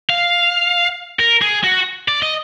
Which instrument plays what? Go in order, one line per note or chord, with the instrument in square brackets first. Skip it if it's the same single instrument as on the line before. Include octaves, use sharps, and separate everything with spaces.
[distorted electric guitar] F5
A#4
G#4
F#4
D5
D#5